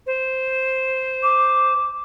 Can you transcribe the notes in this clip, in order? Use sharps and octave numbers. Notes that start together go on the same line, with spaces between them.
C5
D6